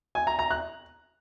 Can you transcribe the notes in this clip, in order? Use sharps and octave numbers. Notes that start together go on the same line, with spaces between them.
G#5
A#5
A#5
F#6